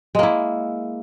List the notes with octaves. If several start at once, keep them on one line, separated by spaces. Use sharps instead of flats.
G#3 A#3 E4